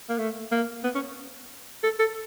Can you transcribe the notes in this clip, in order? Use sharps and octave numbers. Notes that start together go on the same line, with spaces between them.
A#3
A3
A#3
B3
C#4
A4
A4